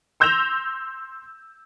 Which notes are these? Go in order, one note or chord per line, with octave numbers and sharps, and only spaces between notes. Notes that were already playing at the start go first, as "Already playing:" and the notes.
C6 E6 G6 A#6 E7 F7